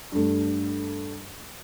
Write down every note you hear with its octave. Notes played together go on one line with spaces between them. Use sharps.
G2 A3